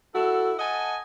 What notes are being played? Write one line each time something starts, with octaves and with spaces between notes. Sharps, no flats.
E4 F#4 A4
D#5 F#5 G#5 A5